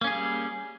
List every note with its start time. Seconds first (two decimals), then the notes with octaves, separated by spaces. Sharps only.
0.01 A#3
0.04 C#4
0.07 G#4
0.10 G3